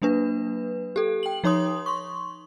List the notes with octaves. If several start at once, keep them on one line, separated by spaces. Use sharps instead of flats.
F#3 A#3 D4 B4
G4 A4
G5 F#7
F3 D#4 C#5 C6 D#6
C6 C#6